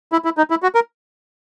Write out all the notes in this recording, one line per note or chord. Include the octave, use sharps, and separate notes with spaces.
E4
E4
D#4
E4
F#4
A#4